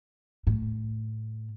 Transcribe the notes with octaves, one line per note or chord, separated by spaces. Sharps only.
A2